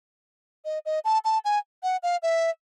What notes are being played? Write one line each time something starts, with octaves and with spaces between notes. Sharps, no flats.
D#5
D#5
A5
A5
G#5
F#5
F5
E5